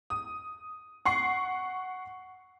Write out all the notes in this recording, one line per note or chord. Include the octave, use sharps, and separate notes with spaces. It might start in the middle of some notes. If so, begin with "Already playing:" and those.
D#6
F#5 C#6 C7